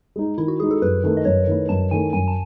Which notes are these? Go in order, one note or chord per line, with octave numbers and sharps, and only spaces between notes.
G#3 D#4
D#3 E4
F#4
G#3 D#4 G#4
A4
F#2 B4
D#3 A3 E4
D#5
F#2 C#5
D#3 A3 E4
F#2 A5
D#3 A3 E4 G#5
F#2 G#5
A5